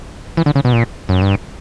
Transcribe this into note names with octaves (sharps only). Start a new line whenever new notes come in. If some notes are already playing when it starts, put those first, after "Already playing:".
E3
D3
C#3
B2
A#2
F#2
G2